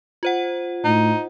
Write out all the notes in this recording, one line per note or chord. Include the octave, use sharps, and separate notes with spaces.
F4 C5 F#5
A2 D#4